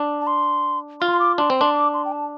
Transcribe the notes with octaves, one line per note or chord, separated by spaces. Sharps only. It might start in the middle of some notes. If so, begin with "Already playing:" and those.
Already playing: D4
A5
C6
F4 C6
C6
D6
D4 C6
C4
D4 C6
D6
C6
G5
A5